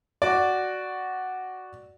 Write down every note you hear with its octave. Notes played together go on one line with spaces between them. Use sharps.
F#4 D5